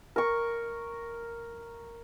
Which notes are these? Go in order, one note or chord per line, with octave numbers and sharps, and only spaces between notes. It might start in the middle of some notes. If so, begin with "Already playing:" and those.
A#4 C#6